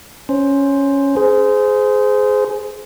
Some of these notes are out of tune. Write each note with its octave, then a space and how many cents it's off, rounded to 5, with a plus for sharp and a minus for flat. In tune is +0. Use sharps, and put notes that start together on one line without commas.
C#4 +0 C5 +5
G#4 +15 C5 -20